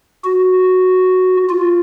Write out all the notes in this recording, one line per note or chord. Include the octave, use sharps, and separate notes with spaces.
F#4
F4